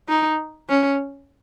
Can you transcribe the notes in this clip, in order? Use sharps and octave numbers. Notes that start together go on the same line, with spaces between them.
D#4
C#4